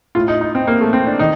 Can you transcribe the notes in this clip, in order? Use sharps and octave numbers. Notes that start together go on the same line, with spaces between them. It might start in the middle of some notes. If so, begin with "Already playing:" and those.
A2 F4
D#4
D#4
C4
A#3
A3
C4
D4
D#3 D#4